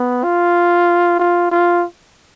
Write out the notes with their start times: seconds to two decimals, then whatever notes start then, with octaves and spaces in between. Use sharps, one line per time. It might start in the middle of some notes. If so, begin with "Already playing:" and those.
Already playing: B3
0.24 F4
1.19 F4
1.52 F4